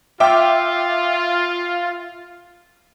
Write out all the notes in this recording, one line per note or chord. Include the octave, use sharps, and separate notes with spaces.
F4 E5 G5 D6